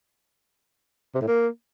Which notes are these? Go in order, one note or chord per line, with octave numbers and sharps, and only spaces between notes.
C3
A2
A#3